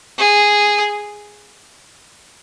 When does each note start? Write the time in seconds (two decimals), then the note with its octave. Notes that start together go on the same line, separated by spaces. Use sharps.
0.18 G#4